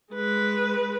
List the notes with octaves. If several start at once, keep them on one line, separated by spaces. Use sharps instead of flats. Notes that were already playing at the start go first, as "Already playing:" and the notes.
G#3 B4